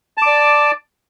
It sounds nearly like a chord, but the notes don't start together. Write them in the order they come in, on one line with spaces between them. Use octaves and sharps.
A5 D6 D5